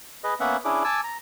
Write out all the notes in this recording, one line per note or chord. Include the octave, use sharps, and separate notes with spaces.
G#4 B4 D#5
A#3 B3 C#4 E5 F#5
C#4 D4 E4 G#4 D6
G#5 A5 D6 E6
A#5